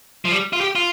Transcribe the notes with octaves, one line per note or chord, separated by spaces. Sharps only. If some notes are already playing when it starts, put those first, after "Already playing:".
F3
G3
F4
G4
F4